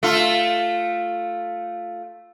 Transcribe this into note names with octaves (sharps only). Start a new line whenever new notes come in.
A3 F4